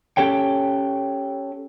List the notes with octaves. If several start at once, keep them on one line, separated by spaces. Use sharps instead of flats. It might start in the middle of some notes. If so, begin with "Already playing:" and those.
C#4 G4 A4 C#5 G5